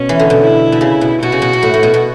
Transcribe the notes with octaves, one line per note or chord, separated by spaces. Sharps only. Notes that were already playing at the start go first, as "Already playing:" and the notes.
Already playing: B2 C#4
E3
D3
B2
E4
B2
C#3
B2
B2 F#4
C#3
B2
B2
A2
A2
B2
B2